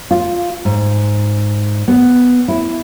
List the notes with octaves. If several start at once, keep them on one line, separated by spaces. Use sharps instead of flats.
F4
G#2
B3
E4